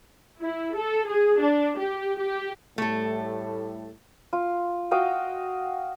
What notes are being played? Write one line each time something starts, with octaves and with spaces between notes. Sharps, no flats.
E4
A4
G#4
D4
G4
G4
A2 G3 A3 A4
F4
F#4 D#5 F5 G5